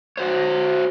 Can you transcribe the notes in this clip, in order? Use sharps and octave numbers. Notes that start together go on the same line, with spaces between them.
F#4 C5 C#5